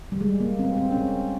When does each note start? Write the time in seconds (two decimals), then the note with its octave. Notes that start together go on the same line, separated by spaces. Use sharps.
0.12 G3
0.21 G#3
0.40 A#3
0.59 C4
0.77 C4
0.92 C#4
0.97 C4